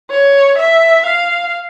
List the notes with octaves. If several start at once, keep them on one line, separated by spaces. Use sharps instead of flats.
C#5
E5
F5